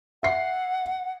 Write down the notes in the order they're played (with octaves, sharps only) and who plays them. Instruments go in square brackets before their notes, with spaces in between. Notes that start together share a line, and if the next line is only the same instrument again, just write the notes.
[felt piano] E5 C7 [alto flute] F#5